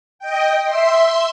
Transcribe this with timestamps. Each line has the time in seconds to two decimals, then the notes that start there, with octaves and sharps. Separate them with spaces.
0.19 D#5 G5
0.65 E5 C6